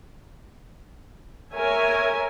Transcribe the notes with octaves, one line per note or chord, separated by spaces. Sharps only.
A#4 C#5 E5 G#5